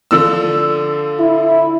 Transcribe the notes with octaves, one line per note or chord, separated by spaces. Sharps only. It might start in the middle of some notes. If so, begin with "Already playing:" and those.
D3 F3 E6
E4